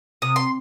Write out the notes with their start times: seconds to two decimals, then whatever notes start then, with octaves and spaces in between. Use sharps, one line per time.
0.22 C3 D#6
0.36 C6